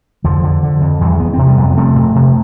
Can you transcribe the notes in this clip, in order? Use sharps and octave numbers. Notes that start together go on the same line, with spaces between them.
F2 D3 F3
D3
D3
F2
E2 E3 G3
E2 B3
C3 C4
G3 B3
F2
C3 A3 C4
F2
C3